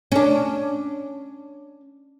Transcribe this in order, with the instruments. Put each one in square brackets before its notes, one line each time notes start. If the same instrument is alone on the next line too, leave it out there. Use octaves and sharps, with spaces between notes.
[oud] C#4 D4